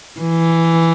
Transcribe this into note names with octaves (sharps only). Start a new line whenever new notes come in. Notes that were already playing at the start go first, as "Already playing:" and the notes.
E3